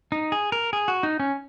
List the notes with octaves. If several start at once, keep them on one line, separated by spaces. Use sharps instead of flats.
D#4
G#4
A#4
G#4
F#4
D#4
C#4